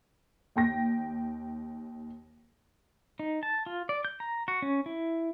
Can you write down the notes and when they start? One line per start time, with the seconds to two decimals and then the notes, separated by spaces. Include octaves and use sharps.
0.56 D#2 G5 A#6
3.19 D#4
3.43 A5
3.66 F4
3.89 D5
4.05 G6
4.20 A#5
4.48 F#4
4.62 C#4
4.86 E4